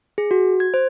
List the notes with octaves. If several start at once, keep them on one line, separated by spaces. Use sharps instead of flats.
G#4
F#4
G#6
C5